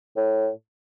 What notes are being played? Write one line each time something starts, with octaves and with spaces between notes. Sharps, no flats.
A2